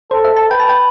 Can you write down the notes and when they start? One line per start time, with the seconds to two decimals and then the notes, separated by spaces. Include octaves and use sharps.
0.11 A4 C5
0.25 E5
0.36 A5
0.50 B4 G5
0.60 A5
0.69 G5